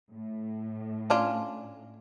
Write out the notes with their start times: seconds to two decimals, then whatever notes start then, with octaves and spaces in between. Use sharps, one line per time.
0.12 A2
1.10 C#4 D4 F4